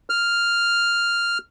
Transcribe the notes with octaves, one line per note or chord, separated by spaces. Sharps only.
F6